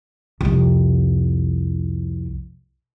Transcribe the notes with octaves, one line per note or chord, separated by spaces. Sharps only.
C2 F2